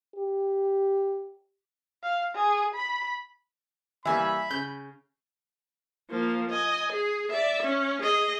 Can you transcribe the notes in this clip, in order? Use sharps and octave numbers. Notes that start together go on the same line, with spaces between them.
G4
F5
G#4
B5
E3 G3 A#3 E5 G#5 B5
C#3 G6
F3 A#3
D#5 G#5
G#4
D5 E5
C#4
G#4 D#5